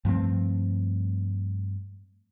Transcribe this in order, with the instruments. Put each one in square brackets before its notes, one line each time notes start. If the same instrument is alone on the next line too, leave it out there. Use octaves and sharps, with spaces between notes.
[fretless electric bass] G2 F3 A3 C4